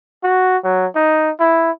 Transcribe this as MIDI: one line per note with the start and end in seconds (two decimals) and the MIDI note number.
0.23 0.57 66
0.64 0.86 54
0.95 1.31 63
1.39 1.71 64